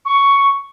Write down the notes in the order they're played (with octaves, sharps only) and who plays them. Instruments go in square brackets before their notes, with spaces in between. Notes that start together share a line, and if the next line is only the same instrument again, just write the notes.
[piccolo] C#6